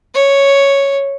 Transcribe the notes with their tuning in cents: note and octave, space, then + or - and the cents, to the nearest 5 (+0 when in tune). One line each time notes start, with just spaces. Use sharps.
C#5 +0